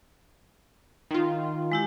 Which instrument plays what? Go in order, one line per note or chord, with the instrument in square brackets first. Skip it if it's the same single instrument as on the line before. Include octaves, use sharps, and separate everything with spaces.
[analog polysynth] D#3 F4
[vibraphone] G#3 E4 G4